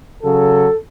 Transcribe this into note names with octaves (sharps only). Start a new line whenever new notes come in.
C#3 F#3 A4